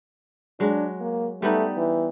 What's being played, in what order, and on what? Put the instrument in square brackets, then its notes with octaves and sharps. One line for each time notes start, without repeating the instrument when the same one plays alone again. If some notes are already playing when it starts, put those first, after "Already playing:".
[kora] F#3 G#3 [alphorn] D4
[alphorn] A#3
[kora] G3 B3 D#4 [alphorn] A3
[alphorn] E3